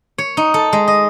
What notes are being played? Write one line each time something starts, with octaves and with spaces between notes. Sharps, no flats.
C#5
D#4
A4
G#3
D#5